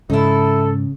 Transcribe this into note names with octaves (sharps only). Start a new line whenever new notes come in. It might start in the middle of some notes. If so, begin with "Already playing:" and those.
G#2 C#3 D#4 E4 A4